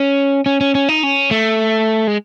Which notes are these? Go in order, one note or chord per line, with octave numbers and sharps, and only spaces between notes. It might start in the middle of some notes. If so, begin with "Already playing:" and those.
Already playing: C#4
C#4
C#4
C#4
D#4
C#4
A3
G#3